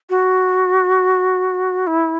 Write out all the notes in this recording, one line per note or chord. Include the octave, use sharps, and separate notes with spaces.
F#4
E4